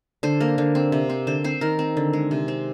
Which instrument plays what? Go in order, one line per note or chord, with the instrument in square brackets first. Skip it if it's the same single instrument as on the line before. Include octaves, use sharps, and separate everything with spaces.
[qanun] D3 C5
A#3 A#4
D3
C4
C3
C4
D3 C5
C4 C5
D#3 A#4
C4
D3
G#3
C3
C4